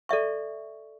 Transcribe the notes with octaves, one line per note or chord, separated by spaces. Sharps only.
A4 D5 E5 C#6